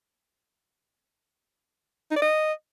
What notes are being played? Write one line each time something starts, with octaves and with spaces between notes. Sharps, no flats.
D#4
D5
D#5